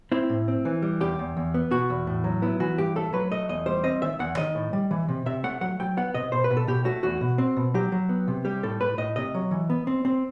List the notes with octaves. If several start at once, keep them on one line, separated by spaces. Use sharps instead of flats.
C4 E4
A2
C4
E3
G3
E2 G4
E2
E2
B3
B2 F#4
E2
A2
F#3
B3 E4
E3 F#4
G2 G4
A3 A4
F#3 B4
A3 D#5
E2 D#5
G3 C5
C4 D#5
D#3 E5
E2 F#5
D#3 D#5
A2
G3
E3
C3
C3 E5
A3 F#5
F#3 F#5
F#3 G5
B3 F#5
C3 D#5
B2 C5
B4
B2
A4
B2 G4
A3 F#4
E2 F#4
B2
C4
B2
F#3 G4
F#3
B3
C3
G3 G4
A2 A4
A2 B4
A2 D#5
C3 D#5
F#3
E3
B3
C4
C4